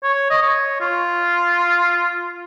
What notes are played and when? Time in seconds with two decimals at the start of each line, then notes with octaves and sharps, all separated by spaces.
0.03 C#5
0.30 D#5
0.42 C#5
0.81 F4